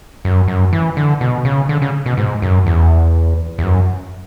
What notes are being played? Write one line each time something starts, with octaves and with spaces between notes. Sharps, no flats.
F#2
F#2
E3
D3
B2
C#3
D3
C#3
B2
G#2
F#2
E2
E2
F#2